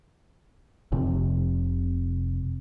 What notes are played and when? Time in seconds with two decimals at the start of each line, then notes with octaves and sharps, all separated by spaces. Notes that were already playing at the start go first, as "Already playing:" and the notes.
0.92 F1 C3